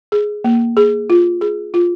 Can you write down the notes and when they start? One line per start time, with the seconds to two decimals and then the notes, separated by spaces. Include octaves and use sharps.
0.12 G#4
0.44 A#3
0.77 G#4
1.10 F4
1.41 G#4
1.74 F4